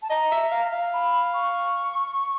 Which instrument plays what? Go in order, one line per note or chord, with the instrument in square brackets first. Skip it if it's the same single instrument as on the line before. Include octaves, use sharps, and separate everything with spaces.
[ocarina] A5
[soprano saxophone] D#5 [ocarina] A#5
[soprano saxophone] E5
F5
F5
[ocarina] B5
C#6